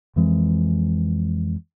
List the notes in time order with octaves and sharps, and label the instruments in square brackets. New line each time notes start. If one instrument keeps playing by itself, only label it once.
[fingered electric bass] F2 E3 G#3 C4